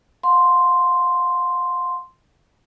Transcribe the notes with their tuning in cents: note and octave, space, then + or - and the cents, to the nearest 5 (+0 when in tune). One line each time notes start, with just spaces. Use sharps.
F5 +40 C6 +0